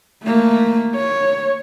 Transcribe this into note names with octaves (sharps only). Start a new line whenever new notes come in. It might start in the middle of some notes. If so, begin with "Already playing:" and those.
A3 A#3
C#5